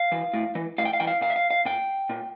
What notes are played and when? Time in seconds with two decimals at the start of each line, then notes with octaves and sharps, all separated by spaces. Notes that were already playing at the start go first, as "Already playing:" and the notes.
Already playing: F5
0.12 E3
0.33 A2
0.55 E3
0.78 A2 F5
0.85 G5
0.93 F5
1.00 E3 G5
1.07 F5
1.21 A#2 F5
1.30 E5
1.36 F5
1.51 F5
1.65 A#2 G5
2.09 A#2